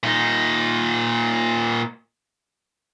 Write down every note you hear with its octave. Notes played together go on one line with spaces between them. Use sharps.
A#2 D#4